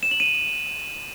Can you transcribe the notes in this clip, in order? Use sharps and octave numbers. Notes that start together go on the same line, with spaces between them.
E7
F#7
D#7